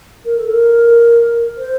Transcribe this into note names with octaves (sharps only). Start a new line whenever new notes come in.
A#4
A4
A#4
C5